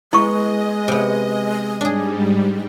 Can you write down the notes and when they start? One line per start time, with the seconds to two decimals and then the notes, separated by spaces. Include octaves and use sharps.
0.13 G#3 B3 E4 D#5 C#6
0.88 C3 B3
1.81 G#2 G3 D4 G#4